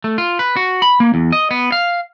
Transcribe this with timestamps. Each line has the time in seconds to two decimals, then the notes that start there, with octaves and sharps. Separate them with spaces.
0.04 A3
0.18 F4
0.39 B4
0.56 F#4
0.82 B5
1.00 A#3
1.14 E2
1.32 D#5
1.51 B3
1.72 F5